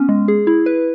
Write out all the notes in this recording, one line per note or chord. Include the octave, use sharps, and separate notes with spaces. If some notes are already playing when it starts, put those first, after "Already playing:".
Already playing: B3 C#4
G#3
G#4
E4
B4